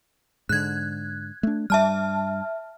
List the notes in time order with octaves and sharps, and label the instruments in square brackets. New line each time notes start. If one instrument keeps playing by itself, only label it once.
[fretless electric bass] G#2 D3 [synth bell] F#6 G#6
[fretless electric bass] A3 D4
[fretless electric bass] G2 G3 [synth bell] E5 A5 F6